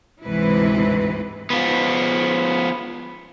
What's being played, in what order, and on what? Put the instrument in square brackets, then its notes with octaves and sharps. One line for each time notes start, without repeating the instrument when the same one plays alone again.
[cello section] D2 G#2 C3 E3 E4 B4
[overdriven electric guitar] F3 B3